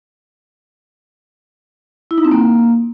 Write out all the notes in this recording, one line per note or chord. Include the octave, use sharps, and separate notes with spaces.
E4
D#4
C4
A#3